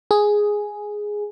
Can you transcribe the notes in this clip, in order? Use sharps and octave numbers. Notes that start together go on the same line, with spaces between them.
G#4